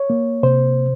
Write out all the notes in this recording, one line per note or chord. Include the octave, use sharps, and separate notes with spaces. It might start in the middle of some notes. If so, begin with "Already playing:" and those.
Already playing: C#5
A#3
C3 C5